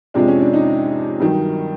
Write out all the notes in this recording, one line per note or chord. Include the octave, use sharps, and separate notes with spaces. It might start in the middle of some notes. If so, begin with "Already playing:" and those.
F2 C3 F3 G#3 D4
C#4
D4
D#4
G2 D#3 F#3